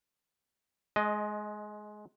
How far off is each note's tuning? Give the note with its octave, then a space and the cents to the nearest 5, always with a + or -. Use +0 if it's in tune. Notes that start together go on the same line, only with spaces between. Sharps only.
G#3 +20 D#5 +0